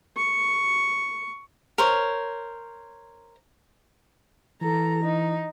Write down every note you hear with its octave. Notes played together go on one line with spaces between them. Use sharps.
C#6
A#4 C5 C#5
E3 A4 A#5
D#4